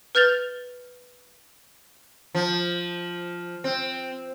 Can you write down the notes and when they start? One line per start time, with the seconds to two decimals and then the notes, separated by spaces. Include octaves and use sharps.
0.15 B4 F6 G6 A6 F7 G7
2.35 F3
3.64 C4